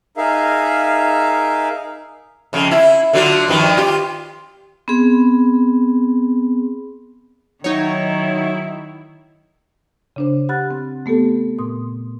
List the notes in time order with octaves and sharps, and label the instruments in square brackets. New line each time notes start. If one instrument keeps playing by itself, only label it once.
[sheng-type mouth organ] D#4 G#4 A#4 E5 F5
[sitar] F2 C#3
E4
D3 F#3 F4
G2 D#3 F3
F4 G4
[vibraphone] B3 C4 G#4
[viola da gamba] D#3 [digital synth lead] F#3 [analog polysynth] D#4 C#5 [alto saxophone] E4
[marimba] C#3 D4 C5
G4 F#5 B5 F6 F#6 A6
C4
A3 B3 G4 A4
A#2 C6 D#6